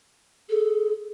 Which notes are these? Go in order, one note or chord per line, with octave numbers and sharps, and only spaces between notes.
G#4 A4